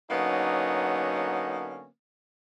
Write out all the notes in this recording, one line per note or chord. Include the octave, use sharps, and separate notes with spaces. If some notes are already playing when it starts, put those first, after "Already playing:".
D3 F#3 A#3 B3 C#4 D#4